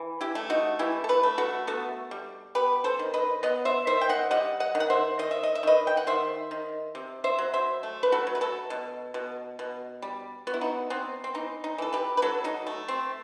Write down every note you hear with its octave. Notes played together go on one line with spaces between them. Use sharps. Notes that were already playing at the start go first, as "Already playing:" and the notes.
Already playing: E3
E4 G4
A3
D#4 F#4
E3 E4 G4
A4
G4 B4
A3
F#4 A4
B3 F#4 A4
G3
B3 G4 B4
A4 C5
D#3
B4 D#5
B3 D#5 F#5
C5 E5
D#3 C5 E5
G5
D#5 F#5
G3 D#5 F#5
D#5 F#5
D#3
F#5
C5 E5
D#3 D#5
E5
D#5
E5
D#3 B4 D#5
G5
F#5
D#3 C5 E5
D#3
C3
C5 E5
F#3
C5 E5
A3
B4
F#4 A4
F#3
B4
F#4 A4
B2
B2
B2
G3
B3 F#4
E4
D#4 F#4
B3 C4
C4
E3 D#4
D#4
E3 A4
G4 B4
B4
F#3 F#4 A4
D#4 F#4
A3
C4